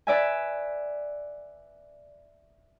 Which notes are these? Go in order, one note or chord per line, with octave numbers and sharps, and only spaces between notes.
B4 D5 E5 G#5